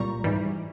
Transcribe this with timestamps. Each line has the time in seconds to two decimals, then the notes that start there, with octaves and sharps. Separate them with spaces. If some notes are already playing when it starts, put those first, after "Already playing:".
Already playing: C2 A#2 G3 A#5 C#6
0.24 G#2 E3 G3